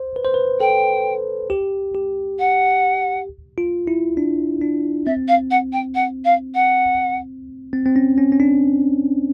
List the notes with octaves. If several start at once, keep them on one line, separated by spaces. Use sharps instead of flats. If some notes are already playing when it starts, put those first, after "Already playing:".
Already playing: C5
B4
C5
B4
A4 G5
G4
G4
F#5
F4
E4
D4
D4
C4 E5
F5
F#5
G5
F#5
F5
F#5
C4
C4
C#4
C#4
C#4
D4